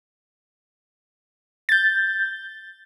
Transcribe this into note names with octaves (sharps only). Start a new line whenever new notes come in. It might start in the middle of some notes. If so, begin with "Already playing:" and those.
G6 A6